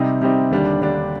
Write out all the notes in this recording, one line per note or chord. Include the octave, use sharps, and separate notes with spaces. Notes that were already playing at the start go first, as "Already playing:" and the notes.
Already playing: C3 G3 C4 D#4
C3 G3 C4 D#4
D#2 D3 G3 D4
D#2 D3 G3 D4